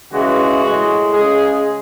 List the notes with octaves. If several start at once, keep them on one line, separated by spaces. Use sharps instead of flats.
C#3 E3 G#3 F#4
A2 G#3
C#3 G#3 G#4